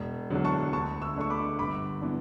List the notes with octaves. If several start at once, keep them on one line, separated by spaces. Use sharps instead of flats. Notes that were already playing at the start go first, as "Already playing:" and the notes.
Already playing: E1
E2 D3 F#3
A5 C#6
D2 A5 C#6
C#6 E6
D3 A3 D4 C#6
B5 D6
G1 B5 D6
E3 B3 D4